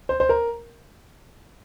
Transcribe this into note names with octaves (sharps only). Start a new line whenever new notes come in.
C5
C5
A#4